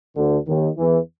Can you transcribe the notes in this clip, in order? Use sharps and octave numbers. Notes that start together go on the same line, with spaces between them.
D2 D3
D#2 D#3
E2 E3